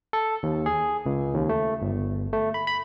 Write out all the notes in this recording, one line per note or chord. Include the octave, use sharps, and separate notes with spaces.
A4
D#2
G#4
C#2
D#2
A3
G1
A3
B5
B5